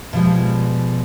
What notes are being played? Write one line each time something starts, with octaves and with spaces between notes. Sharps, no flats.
B2 F3 G3 G#3